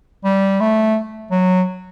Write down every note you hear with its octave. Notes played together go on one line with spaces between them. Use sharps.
G3
A3
F#3